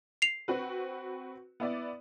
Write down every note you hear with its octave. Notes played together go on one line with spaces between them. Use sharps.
C7 F7
C4 F#4 B4
B3 E4 D5